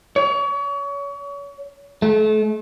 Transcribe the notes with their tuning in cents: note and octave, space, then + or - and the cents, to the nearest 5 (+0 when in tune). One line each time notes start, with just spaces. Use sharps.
C#5 +35
A3 -35